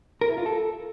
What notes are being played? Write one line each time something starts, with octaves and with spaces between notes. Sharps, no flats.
A#4
E4
F4
A4